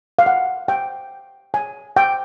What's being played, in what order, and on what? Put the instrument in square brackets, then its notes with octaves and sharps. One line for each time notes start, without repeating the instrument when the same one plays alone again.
[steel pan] F5
F#5
G5
G#5
G5